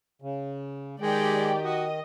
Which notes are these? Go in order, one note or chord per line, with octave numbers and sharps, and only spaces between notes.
C#3
D#3 G#3 G4 D5 G5
F#4 D#5